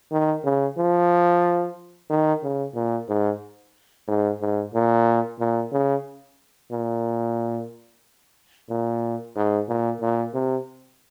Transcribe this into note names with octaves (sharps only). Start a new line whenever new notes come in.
D#3
C#3
F3
D#3
C#3
A#2
G#2
G#2
G#2
A#2
A#2
C#3
A#2
A#2
G#2
A#2
A#2
C3